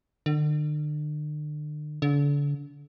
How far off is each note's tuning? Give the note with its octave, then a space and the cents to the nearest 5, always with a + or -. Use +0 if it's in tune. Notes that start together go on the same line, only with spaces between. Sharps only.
D3 +40
D3 -35